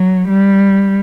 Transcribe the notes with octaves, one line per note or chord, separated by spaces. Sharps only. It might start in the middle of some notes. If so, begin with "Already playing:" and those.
Already playing: F#3
G3